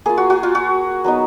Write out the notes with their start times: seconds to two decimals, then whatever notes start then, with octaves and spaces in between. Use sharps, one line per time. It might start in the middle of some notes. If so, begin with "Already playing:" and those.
0.06 A#3 F4 G#4
0.17 F#4
0.30 F#4
0.43 F4
0.55 F#4
1.04 F#3 B3 D#4